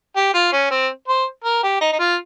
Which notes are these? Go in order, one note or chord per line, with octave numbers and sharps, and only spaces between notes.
G4
F4
C#4
C4
C5
A#4
G4
D#4
D#4
F4